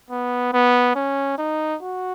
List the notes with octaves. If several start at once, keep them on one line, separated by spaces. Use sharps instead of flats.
B3
B3
C#4
D#4
F#4